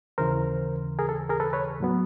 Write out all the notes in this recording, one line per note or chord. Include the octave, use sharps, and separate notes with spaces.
D#2 C#3 E3 A#4 C5
G#4 A#4
A4
G#4 A#4
A4 B4
B4 C#5
A2 F#3 B3